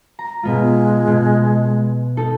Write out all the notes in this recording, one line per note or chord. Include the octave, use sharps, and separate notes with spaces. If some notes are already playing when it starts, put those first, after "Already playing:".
A#5
B2 G#3 B3 F4
B2
D#4 A4